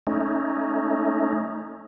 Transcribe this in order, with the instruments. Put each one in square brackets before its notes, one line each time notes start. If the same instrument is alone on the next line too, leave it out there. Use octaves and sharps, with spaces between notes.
[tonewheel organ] A3 C#4 D#4